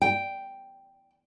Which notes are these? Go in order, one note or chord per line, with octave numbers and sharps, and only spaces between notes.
G5